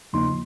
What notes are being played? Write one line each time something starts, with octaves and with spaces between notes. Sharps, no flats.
E2 C#3 F3 A#3 D#4 C6